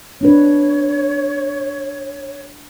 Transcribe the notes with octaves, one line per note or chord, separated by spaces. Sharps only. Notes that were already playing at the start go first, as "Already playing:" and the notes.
C4 D4 B4 C#5